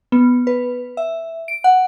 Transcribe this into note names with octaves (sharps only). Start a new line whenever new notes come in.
B3
B4
E5
D7
F#5